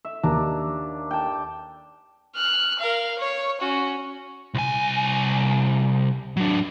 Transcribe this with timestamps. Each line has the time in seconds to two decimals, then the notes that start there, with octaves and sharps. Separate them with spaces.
0.05 E5
0.23 D#2 D4 A#5
1.11 G5 A5
2.36 F6 F#6
2.80 A#4 F5
3.19 C#5
3.61 C#4 F#4
4.54 C2 G#5
6.37 F#3 D4